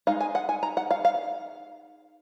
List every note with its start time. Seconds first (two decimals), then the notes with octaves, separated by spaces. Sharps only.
0.07 G#3 D#4 F5
0.21 G#5
0.35 F#5
0.49 G#5
0.63 A#5
0.77 F#5
0.91 F5
1.05 F5